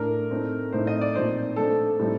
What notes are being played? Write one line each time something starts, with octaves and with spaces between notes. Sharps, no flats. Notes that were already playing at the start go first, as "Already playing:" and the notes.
Already playing: A2 A3 D4 A#4
A2 A3 C4 D#4
A2 A3 C4 D#4 C5
D#5
D5
A#2 F3 C4 D#4 C5
F3 A3 D4 A4
A2 G3 C4 D#4